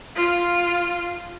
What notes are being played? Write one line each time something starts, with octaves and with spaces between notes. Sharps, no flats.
F4